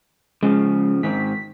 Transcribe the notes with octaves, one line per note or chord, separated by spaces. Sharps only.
C#3 F3 G#3
G#2 D#3 C4 B6